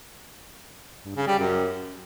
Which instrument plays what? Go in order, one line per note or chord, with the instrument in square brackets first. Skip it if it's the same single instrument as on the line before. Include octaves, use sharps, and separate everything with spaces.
[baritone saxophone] G2
C#3
G3
F#2